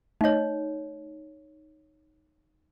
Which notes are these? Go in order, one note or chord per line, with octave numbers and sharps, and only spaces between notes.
A3 D#4 C#5 D#5